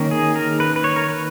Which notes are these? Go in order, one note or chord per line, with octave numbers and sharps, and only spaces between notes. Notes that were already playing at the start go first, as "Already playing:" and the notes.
Already playing: D#3 A#3 C#4
G#4
A#4
B4
B4
C#5
A#4
B4